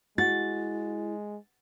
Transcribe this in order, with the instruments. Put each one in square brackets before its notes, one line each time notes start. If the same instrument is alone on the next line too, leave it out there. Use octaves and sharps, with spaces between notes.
[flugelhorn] G#3 [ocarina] E4 [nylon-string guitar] F#4 [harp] A6